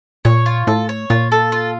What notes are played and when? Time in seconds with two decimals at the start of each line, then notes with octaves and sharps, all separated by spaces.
0.25 A#2 C#5
0.46 F4
0.67 A2 A4
0.89 C#5
1.10 A#2 F4
1.32 A4
1.52 F4